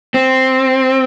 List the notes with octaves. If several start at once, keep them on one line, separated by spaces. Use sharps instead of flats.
C4